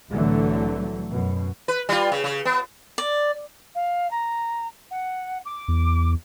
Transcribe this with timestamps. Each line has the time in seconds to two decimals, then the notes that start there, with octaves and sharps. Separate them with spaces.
0.12 C2 A2 D3 E3 F#3 A3
1.11 F#2 B2
1.68 B4
1.89 G3 F4
2.12 C#3
2.24 C#3
2.45 B3
2.98 D5
3.75 F5
4.11 A#5
4.91 F#5
5.45 D6
5.68 E2